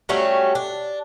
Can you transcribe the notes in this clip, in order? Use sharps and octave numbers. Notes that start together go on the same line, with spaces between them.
F#3 G3 A3 C#4
D4